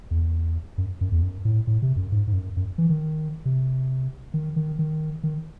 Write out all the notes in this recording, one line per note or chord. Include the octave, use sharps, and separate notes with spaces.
E2
F#2
F#2
E2
F#2
A2
A2
C3
F#2
G#2
G#2
F#2
F#2
E3
D#3
C3
D#3
D#3
D#3
D#3